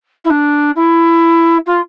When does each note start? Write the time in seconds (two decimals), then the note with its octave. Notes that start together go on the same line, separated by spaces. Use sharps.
0.25 E4
0.30 D4
0.76 E4
1.67 F4